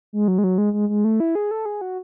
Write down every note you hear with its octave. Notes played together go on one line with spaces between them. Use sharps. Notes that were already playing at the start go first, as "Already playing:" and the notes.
G#3
F#3
G#3
F#3
G#3
G#3
G#3
A3
E4
G#4
A4
G#4
F#4